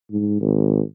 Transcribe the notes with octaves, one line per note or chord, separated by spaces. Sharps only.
G#2
G#1